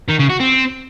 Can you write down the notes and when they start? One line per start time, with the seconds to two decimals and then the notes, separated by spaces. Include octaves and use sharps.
0.08 D#3
0.19 C#3
0.30 F#4
0.40 C4